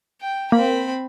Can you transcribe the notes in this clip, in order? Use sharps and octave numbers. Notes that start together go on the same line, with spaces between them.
G5
A#3 C4 B5